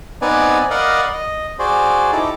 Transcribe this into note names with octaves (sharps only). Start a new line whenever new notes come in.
B3 C4 D#4 B4 D5 G#5
A#4 D5 D#5 F5 F#5 B5
D#5
F#4 G#4 C5 D5
D#4 E4 G4 A4